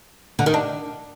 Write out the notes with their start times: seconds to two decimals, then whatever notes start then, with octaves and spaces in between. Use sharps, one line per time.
0.39 D3
0.46 D#3
0.54 D4